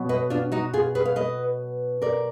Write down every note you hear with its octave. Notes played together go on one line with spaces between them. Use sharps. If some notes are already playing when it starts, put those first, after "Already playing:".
Already playing: B2 F#3 B3
B4 D#5
D4 F4
D#4 F#4
F4 G#4
G#4 B4
F5
B4 D#5
A#4 D5